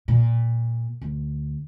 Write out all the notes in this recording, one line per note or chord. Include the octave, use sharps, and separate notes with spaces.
A#2
D2